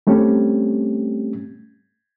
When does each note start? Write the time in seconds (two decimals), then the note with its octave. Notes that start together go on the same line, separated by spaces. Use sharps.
0.07 G3 A3 C4 C#4 G4